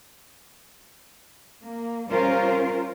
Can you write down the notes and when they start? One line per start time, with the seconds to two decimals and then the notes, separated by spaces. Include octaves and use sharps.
1.64 A#3
2.11 G3 C#4 F4 A#4 C5